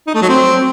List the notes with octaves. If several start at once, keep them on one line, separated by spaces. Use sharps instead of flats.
D#4
A3
F#3
C4